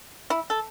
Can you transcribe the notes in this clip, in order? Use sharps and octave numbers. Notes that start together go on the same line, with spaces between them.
E4
A4